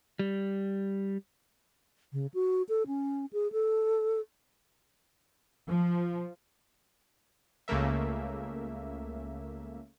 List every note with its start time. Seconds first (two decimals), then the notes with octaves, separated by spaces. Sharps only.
0.19 G3
2.13 C#3
2.34 F#4
2.69 A4
2.87 C#4
3.33 G#4
3.52 A4
5.68 F3
7.68 C#2 C#3 A3 A#3 E5